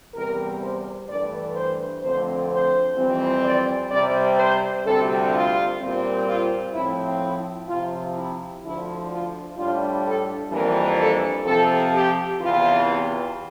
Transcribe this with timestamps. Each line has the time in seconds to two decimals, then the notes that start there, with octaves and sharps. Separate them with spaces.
0.14 E2 C3 E3 G3 A#4
0.61 C5
1.09 G2 E3 A3 D5
1.55 C5
2.03 F2 D3 A3 C4 C5
2.50 C5
2.97 F2 E3 G3 C4
3.44 D5
3.91 C3 G3 C4 D5
4.38 C5
4.85 D2 C3 G3 C4 A4
5.33 F4
5.80 A#2 G3 C4
6.27 F4
6.73 A2 F3 C4 E4
7.21 E4
7.68 C3 F3 C4 F4
8.15 E4
8.62 D2 D3 F3 E4
9.10 F4
9.57 A2 G3 D4 F4
10.04 A4
10.51 F2 E3 G3 A#3 D4 A#4
10.98 A4
11.45 C3 F3 C4 A4
11.93 G4
12.39 E2 C3 E3 F4